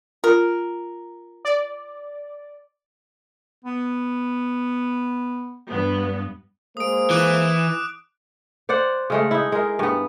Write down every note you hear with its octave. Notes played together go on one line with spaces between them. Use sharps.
F4 A#4
D5
B3
G2 B3
G#3 A#3 C5 D#6 D7
E3 D6 F#6 D7
C5 D5 F#5
C#3 G#3 A3
D#4 E4
G#3 A#4
G2 B3